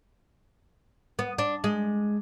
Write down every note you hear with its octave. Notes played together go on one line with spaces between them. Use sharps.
B3
D4
G#3